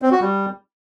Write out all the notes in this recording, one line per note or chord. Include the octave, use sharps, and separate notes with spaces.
C4
F#4
G3